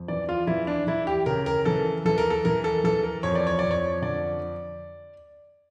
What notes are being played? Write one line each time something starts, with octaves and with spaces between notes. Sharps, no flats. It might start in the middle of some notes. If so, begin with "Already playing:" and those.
Already playing: F2
E3 D5
F4
E3 E4
D4
E3 E4
G4
C#3 A#4
A#4
E3 A4
E3 A4
A#4
A4
E3 A#4
A4
E3 A4
A#4
F2 C#5
D5
C#5
F2 D5
C#5
D3 D5